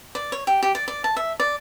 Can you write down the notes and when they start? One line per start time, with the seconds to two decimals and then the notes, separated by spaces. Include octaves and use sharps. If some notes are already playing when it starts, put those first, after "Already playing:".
0.15 D5
0.32 C#5
0.47 G4
0.63 G4
0.75 D5
0.88 D5
1.04 A5
1.16 E5
1.40 D5